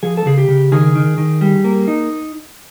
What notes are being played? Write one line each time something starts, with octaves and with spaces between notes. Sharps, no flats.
F3 G#4
A4
C#3 G#4
G4
C#3
D#3 G#4
D#3
D#3
G3
A#3
D#4